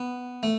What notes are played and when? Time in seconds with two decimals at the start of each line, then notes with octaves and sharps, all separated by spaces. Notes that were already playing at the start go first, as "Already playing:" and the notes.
Already playing: B3
0.43 A3